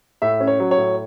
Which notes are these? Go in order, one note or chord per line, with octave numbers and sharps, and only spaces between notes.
A2 E5
C#4
C#5
F#3
C#5
A2